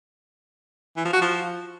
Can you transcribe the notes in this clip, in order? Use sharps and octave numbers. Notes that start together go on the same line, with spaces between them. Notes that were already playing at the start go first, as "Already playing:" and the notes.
E3
F3
F#4
F3